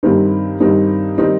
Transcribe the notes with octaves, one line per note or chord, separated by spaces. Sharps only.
G2 D#3 G3 C4 D#4
G2 D#3 G3 C4 D#4
D#3 G3 C4 D#4